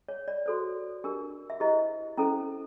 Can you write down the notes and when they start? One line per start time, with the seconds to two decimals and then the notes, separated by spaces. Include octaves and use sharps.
0.09 C#5
0.28 D5
0.46 F#4 A4 C5
1.04 D4 G4 A#4
1.50 E5
1.60 E4 G4 C5 D#5
2.17 C#4 E4 A4 C5